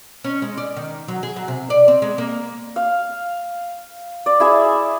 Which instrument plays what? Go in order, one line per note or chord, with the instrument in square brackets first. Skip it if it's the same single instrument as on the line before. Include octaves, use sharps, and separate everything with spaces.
[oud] C#4
G#3
D5
D#3
F#3
G#4
F#3
C3
D5
C4
G#3
A#3
[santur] F5
D5
E4 G#4 E5